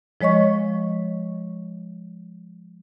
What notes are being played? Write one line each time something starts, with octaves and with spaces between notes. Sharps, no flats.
F3 G#3 C#5 D#5 C#6